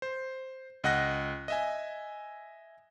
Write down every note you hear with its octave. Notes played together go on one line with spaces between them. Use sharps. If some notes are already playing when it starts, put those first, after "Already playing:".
C5
C#2 D#5 F#5 F#6 A#6
D#5 E5 G#5